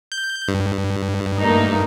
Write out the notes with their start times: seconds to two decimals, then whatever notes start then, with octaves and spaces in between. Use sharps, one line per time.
0.12 G6
0.48 G2
1.37 A3 A#3 D#4